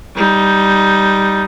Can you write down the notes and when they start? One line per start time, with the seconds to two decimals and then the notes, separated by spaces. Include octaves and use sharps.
0.16 G3 D#4